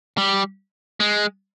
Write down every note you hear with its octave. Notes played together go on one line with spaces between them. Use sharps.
G3
G#3